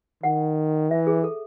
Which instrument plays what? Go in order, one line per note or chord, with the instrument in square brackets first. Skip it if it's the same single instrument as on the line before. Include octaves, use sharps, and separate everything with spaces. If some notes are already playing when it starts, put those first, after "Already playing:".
[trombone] D#3 [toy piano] F#5
[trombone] E3 [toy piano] E5
[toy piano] G#4
A4